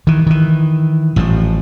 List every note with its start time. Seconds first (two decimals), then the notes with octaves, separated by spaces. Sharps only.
0.07 D#3 E3
0.27 D#3 E3
1.16 A1 A2 C3 F3